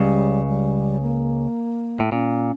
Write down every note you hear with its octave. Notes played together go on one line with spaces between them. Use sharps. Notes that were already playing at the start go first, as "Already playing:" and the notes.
Already playing: C#2 C#3 G3
G3
A#3
A2
A#2 C#4